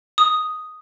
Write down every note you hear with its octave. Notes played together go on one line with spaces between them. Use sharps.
D#6